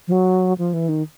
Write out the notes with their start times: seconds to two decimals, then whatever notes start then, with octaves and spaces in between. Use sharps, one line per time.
0.08 F3
0.12 F#3
0.58 F3
0.73 E3
0.89 D#3